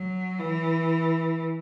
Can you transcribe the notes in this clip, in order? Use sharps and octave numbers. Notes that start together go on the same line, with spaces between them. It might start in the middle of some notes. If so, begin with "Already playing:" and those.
Already playing: F#3
E3